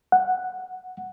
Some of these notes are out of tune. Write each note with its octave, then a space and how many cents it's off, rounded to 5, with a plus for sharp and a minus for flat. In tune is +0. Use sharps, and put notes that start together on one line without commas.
F#5 -5